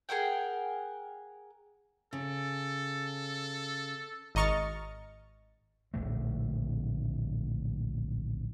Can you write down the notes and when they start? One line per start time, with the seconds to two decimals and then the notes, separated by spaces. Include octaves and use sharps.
0.09 G#4 A#4 F#5 G5
2.13 C#3 A4
4.35 G#1 D#5 A#5 C#6 F6 A6
5.94 D1 A#1 D3 A3